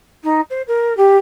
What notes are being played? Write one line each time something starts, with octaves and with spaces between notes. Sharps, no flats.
D#4
C5
A#4
G4